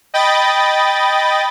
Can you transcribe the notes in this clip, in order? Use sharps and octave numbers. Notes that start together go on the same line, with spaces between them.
D#5 G5 B5 A6